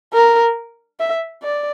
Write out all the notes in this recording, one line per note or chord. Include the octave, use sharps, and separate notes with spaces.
A#4
E5
D5